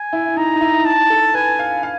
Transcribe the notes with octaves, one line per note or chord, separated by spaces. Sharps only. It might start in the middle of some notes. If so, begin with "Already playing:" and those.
Already playing: G#5
E4
D#4 A#5
D#4
E4
A5
A4
B4 G#5
F5
F5